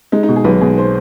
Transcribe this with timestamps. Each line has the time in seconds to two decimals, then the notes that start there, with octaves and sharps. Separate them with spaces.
0.12 G#3 D#4
0.23 D#4
0.28 B2
0.36 G#4
0.44 B1 B4
0.61 B2 G#4
0.78 C5